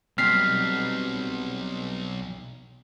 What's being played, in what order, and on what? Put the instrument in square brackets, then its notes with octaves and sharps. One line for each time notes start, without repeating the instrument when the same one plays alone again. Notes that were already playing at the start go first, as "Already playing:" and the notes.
[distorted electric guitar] B1 [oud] G3 C4 [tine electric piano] F6 B6 C7